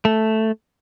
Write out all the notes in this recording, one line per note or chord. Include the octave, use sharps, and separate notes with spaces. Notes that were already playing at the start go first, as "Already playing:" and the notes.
A3